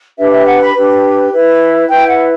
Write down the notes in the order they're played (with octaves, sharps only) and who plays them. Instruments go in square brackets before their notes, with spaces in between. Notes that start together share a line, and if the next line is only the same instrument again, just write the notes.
[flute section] D4 G4 B4 E5
E5
F#5
B5
D4 G4 B4
E4 B4
E4 B4 G5
F#5